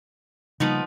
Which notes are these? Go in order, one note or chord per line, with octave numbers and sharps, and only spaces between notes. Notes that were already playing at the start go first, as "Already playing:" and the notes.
C#3 F3 G3 A#3 B3 D#4